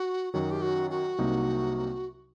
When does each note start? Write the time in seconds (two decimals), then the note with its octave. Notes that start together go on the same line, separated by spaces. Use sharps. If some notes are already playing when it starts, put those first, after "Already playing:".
Already playing: F#4
0.33 F#2 D#3 F#3 F#4
0.51 G4
0.62 F#4
0.90 F#4
1.19 C2 C3 F#3 A#3 D#4